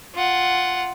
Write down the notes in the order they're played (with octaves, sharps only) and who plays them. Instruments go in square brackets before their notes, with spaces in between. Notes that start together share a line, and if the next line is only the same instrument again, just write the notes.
[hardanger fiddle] F4 F#5